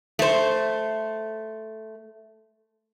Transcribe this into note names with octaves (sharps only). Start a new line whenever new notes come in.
A3 C5